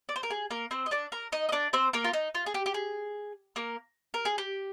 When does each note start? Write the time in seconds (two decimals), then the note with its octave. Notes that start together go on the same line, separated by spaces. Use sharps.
0.09 D5
0.16 C5
0.23 A#4
0.30 G#4
0.51 A#3 A#4
0.71 C4 C5
0.86 D#5
0.91 D4 D5
1.12 A#4 A#5
1.32 D#4 D#5
1.49 D#5
1.52 D4 D5
1.73 C4 C5
1.93 A#3 A#4
2.04 F4
2.13 D#4
2.35 F4
2.46 G#4
2.54 G4
2.66 G4
2.74 G#4
3.56 A#3 A#4
4.14 A#4
4.25 G#4
4.38 G4